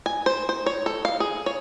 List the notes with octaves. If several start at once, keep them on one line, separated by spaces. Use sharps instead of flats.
G#5
C5
C5
C#5
A4
F5
G#4
C#5